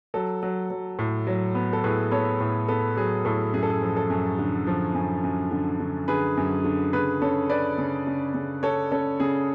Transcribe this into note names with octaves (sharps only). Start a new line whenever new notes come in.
F#3 A4
F#3
F#3
A2
F#3
B3
A4
A2 G#4 B4
B3 A4 C#5
A2
B3 A4
F#3 G#4
A2 A4
F#2 G#4
A4
G#4
F3
A4
F#2
D3
F3
F#2
F#2
D3
D3
D3 G#4 B4
F#2
D3
C#3 G#4 B4
C#3 A4 C#5
C#4 B4 D5
C#3
C#3
C#3
C#4 A4 C#5
C#4 A4
C#3 G#4